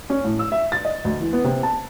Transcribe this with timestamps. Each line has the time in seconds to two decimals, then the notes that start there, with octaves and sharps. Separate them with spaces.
0.10 C#4
0.25 A2
0.39 E6
0.52 E5
0.72 A6
0.85 D#5
1.05 D2
1.21 E3
1.33 B3
1.44 C3
1.63 A5